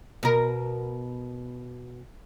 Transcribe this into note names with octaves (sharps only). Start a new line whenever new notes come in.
B2 A#4